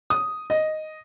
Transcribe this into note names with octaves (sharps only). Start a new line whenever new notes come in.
D#6
D#5